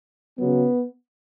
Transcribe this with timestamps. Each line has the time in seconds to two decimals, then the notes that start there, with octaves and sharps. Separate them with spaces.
0.39 C#3 F#3 B3